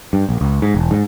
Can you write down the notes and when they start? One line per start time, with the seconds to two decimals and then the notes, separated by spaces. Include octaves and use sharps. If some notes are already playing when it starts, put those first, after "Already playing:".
0.13 G2
0.29 A#1
0.41 C#2
0.62 G#2
0.74 E1
0.91 G#2